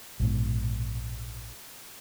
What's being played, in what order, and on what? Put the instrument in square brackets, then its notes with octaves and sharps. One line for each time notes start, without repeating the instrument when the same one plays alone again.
[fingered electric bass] A#1 G#2 B2